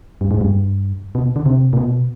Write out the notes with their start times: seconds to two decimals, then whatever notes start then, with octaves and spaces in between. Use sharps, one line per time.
0.21 G2
0.31 G#2
0.41 G2
1.15 B2
1.36 D3
1.46 C3
1.73 A#2
1.77 B2